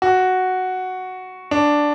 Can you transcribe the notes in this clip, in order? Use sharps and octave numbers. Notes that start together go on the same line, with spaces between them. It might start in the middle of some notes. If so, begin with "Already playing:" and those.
F#4
D4